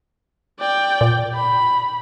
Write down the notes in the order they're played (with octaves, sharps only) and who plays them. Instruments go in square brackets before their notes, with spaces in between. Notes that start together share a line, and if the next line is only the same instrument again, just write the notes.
[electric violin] D5 G5
[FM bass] A#2
[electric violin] B5